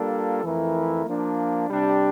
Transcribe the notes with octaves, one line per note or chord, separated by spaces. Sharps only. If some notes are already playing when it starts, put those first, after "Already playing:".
Already playing: G3 A#3 D4 F4 A4
F2 E3 A3 E4 A#4
F3 A#3 D4
C3 G3 D4 G4